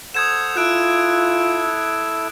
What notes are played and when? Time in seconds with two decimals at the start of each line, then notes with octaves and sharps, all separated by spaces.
0.14 A4 C5 F#5 D#6 G#6 E7
0.57 E4 F4 A4 F#6 D7